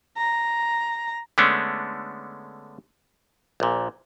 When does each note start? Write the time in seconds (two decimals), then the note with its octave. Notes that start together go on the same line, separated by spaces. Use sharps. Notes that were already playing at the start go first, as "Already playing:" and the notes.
0.17 A#5
1.38 D3 G#3 A3 B3 C#4 D4
3.60 A#1 A#2